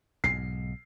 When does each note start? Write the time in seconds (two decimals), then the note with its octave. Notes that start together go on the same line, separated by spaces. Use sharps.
0.24 B1 G#2 C7